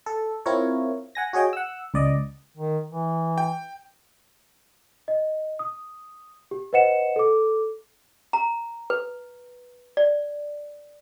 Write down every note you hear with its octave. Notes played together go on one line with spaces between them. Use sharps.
A4
C4 E4 F4 A#4 C#5
F#5 G#5 A#6
F#4 G#4 C#5 D#5 G5
F#5 E6
C#2 D5 D#5
D#3
E3
G5
D#5
D#6
G4
B4 C5 D#5 F#5 C#7 E7
A4 D6
A#5
B4
D5